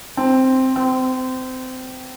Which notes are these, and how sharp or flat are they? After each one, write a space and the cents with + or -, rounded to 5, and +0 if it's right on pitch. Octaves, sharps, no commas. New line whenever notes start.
C4 +0
C4 -25